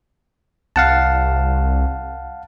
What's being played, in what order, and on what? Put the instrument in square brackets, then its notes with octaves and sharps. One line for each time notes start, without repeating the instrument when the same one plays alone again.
[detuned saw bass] C2 [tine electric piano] F5 F#5 A5